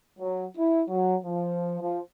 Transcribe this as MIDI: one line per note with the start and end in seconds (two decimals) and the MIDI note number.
0.19 0.46 54
0.57 0.82 64
0.89 1.16 54
1.24 1.78 53
1.80 1.99 53